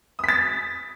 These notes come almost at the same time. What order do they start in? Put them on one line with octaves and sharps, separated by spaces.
D#6 B6 A6